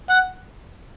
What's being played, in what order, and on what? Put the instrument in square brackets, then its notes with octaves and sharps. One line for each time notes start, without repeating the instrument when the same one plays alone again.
[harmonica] F#5